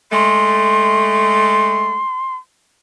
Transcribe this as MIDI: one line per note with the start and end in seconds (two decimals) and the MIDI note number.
0.12 2.00 56
0.12 2.00 57
0.12 2.35 84